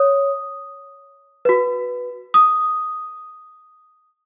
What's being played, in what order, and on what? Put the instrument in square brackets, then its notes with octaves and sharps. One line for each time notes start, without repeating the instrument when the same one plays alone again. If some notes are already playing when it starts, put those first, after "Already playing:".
Already playing: [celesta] C#5 D#6
F#4 B4
D#6